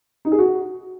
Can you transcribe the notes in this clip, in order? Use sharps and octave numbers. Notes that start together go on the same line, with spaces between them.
D#4
G#4
F#4